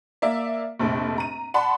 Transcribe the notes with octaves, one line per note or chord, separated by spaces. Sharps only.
A#3 D5 E5
F1 A#1 A3
A#5 D#7
D5 F#5 A5 B5 C6